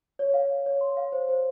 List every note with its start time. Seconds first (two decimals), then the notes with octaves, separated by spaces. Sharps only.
0.19 C#5
0.34 F5
0.49 F5
0.66 C#5
0.81 C6
0.97 F5
1.12 C5
1.29 C5